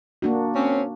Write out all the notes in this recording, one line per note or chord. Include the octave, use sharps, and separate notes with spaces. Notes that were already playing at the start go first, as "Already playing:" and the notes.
A#3 D4 F#4
C4 C#4